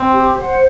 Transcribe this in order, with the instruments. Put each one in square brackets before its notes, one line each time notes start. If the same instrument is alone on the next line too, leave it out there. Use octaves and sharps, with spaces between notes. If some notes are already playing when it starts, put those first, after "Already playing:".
Already playing: [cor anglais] C4
[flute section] G4
C5 F#5